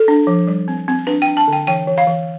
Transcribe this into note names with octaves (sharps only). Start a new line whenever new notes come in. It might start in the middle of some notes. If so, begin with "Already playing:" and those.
Already playing: A4
D4
F3
G3
C4
C4
D4 B4
G5
D4
A5
D3 G5
E3 G5
E3
F5
E3